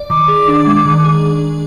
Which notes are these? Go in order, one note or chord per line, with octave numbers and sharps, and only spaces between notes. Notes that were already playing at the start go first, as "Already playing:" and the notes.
Already playing: D5
D#3 D6
G#4
D4
G#3
D#3
G#4